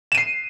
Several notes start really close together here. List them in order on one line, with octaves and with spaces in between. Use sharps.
E7 D#7 C7